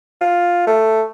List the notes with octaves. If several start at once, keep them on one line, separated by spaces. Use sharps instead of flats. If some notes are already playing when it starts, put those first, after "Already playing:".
F4
A3